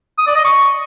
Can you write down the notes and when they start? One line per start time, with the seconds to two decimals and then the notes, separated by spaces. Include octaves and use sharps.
0.18 D#6
0.27 D5
0.36 D#5
0.44 C#6